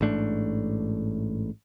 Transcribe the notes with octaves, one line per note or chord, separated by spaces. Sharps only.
A1 G#2 A3 D4